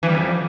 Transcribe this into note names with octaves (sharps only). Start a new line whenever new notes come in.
E3
G3
F2